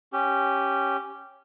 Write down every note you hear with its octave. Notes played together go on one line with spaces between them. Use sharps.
C#4 G4